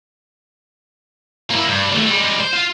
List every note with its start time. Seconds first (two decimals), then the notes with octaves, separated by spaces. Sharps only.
1.51 A#3 E4
1.68 G2
1.92 D#2 A3
2.06 G3 G#3
2.40 C5
2.53 F4